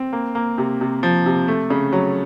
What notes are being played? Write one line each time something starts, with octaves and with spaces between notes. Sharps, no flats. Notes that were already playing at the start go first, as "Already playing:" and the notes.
Already playing: C4
A#3
A#3
C3
C3
F3
C3
A3
C#3
F#3